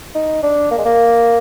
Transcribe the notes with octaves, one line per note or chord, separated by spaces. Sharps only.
D#4
D4
A#3
G#3
A#3